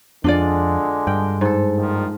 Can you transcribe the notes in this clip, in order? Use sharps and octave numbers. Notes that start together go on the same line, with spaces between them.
F2 D3 G#3 D4 F4 D5
G2 G5
G#2 A4
A#1 D#3 F3